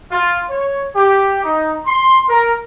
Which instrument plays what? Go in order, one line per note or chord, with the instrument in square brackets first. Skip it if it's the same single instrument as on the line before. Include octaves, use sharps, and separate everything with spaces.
[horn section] F4
C#5
G4
D#4
C6
A#4